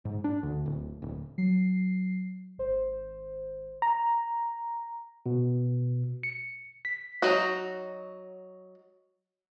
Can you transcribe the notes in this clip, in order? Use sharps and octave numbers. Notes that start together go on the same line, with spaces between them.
G#2
D4
D2
D1
D1
F#3 C7
G#1 C5
A#5
B2
C#7
B6
F#3 D#4 F#4